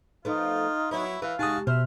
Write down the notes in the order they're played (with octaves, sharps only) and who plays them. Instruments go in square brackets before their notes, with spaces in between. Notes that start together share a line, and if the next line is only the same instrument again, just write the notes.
[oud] F3 A3 B3 [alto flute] D#4 [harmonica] F4
[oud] F#3 B3 [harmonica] E4 C#5
[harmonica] E3 [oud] B4 [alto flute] F5
[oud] C3 G#3 [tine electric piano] D#4 D#6 [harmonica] F#4 G#5 A5
[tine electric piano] B2 [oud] C5 [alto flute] E5 [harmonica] F6